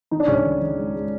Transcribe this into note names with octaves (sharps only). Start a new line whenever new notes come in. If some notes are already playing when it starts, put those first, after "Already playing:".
D#3 D#4
D4
C#2 C#4
D4
D#3
D#3
G#3
G#3